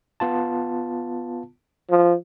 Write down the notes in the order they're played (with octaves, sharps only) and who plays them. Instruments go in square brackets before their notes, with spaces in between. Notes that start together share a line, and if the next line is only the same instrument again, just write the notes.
[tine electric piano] B3 F4 A5
[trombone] F3